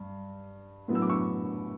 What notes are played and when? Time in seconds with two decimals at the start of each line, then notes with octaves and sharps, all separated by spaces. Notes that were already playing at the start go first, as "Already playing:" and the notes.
Already playing: G2
0.88 A2 F#3 B3
0.95 E6
1.02 D6
1.09 C#6 E6